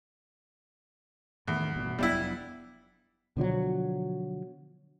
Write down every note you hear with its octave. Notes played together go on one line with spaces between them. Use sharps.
E2 A2 D#3 A3
A1 G2 B2
F1 F#3 G3 B3 D4 E4
B2 D3 F3 F#3